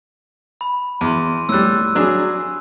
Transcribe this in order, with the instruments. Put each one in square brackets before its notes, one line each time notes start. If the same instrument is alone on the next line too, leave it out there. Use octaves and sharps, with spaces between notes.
[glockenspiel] B5
[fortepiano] E2 [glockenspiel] C6 D#7
[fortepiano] A2 G3 [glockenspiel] E6 F#6
[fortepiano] F#3 D4 G#4